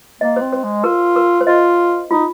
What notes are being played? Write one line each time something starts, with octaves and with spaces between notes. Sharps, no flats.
A#3 D#5
C5
C4
C5
G#3
F4 A#4
A#4
C5
F4 D#5
D#4 F4